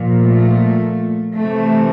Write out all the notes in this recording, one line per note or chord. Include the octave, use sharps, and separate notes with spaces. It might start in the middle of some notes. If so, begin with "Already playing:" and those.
Already playing: A#2 F3
A3
C3 E3 A3